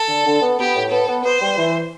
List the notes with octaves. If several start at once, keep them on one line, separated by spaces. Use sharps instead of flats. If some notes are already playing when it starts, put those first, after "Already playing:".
Already playing: A4
D3
D3
B3
B3 G4
A2
B3 A4
B3
B3 C5
G3
E3